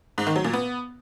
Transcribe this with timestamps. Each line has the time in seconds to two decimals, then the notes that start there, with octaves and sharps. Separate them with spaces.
0.18 G#2
0.27 D#3
0.36 F#3
0.45 A#2
0.53 B3